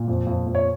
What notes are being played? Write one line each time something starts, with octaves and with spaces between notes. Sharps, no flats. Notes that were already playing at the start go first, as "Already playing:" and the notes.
Already playing: A#2
F2
F2
F2
C#5